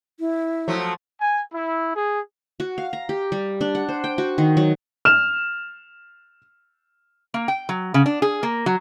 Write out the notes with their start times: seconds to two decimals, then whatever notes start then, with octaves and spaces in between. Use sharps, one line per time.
0.20 E4
0.68 F3 F#3 A3
1.20 G#5
1.53 E4
1.96 G#4
2.60 F#4
2.78 F5
2.93 A#5
3.09 G4
3.32 G3
3.61 D4
3.75 F#5
3.88 C5
4.04 G5
4.18 F#4
4.38 D#3
4.57 F#3
5.05 F6 E7
7.34 A#3
7.48 G5
7.69 F#3
7.94 C#3
8.06 D4
8.22 G#4
8.43 A#3
8.66 F#3